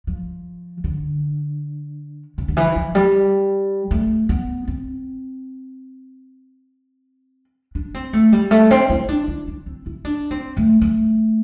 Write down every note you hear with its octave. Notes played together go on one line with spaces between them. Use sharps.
F3
D3
C3
D3
E3
F3
G3
A3
B3
C4
D4
C4
A3
G3
A3
C4
E4
D4
E4
D4
C4
E4
D4
C4
A3
A3